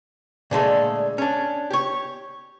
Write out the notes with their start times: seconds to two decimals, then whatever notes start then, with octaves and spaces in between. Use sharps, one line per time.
0.51 A#2 D3 G#3 A3
1.18 C#4 D4
1.71 G4 C#5